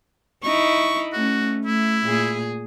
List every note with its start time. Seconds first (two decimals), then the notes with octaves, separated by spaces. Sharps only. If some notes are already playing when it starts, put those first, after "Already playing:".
0.43 D#4 E4 C#6
1.13 A3 C#4 F#4
1.65 A3 E4
2.05 A#2 G#4